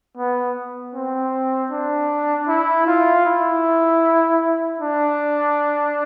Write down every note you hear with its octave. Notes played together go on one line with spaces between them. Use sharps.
B3
C4
D4
E4
F4
E4
D4